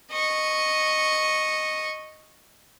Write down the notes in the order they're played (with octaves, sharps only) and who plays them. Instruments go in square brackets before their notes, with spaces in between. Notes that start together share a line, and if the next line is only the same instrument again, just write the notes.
[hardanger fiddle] D#5 C#6